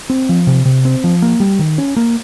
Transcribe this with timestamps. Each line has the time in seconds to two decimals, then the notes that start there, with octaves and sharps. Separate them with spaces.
0.10 C4
0.29 F3
0.47 C3
0.66 C3
0.85 C4
1.04 F3
1.22 A#3
1.40 G3
1.59 D#3
1.78 C#4
1.97 A#3